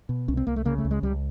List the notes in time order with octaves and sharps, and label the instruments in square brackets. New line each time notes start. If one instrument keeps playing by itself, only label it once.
[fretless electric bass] B2
C2 C#4
C4
C2 A#3
A3
C#3 A#3
A3
C#2
G#3
C#2 G3